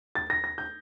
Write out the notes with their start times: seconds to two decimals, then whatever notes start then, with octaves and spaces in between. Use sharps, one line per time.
0.15 A6
0.30 A#6
0.44 A#6
0.58 G6